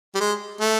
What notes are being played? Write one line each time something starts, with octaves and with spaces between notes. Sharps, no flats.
G3
G#3
A3